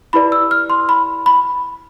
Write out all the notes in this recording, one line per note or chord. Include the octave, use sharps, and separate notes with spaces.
E4 G4 B4 D5 B5
E6
F6
C6
B5
B5